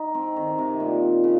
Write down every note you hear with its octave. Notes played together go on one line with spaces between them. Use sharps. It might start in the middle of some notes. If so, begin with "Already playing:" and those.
Already playing: D#4
C4
D#3
C3
A#2
C#3